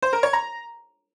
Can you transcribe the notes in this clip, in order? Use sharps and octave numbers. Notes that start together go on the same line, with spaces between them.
C5
A#4
C#5
A#5